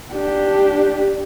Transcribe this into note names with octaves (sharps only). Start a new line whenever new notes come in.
D4 G4